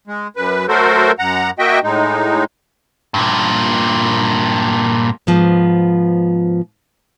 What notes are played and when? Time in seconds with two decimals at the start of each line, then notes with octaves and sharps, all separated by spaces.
0.07 G#3
0.36 F#2 B4
0.69 F#3 A3 F#4 A4 A#4 C5
1.19 F#2 F#5 A#5
1.59 A#3 F#4 D#5 E5 G5
1.83 A2 G#3 D#4
3.14 G2 A#2
5.27 G#2 F3 B3